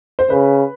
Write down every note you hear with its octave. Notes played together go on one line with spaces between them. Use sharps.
C5
C#3 B4